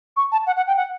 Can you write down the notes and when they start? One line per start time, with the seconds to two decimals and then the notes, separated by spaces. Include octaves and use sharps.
0.17 C#6
0.32 A5
0.47 F#5
0.57 F#5
0.67 G5
0.77 F#5